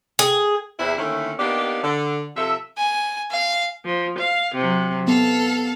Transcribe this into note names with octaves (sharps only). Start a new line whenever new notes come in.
G#4
E2 C3 E4
D3 D#3 A3 A#3 C#4 E4
A#3 B3 D4 D#4 G4
D3
C3 F3 A4 E5
G#5
F5
F3
F5
C3 F#3
B3 A4 F5